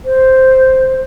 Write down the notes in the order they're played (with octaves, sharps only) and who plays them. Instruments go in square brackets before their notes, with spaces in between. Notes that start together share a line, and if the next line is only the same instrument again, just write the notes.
[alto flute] C5